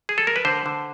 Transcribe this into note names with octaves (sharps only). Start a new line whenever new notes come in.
G#4
A4
A#4
B4
D3 C5
D3